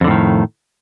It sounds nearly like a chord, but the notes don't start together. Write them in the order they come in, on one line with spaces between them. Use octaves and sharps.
F2 D3 A2 D#3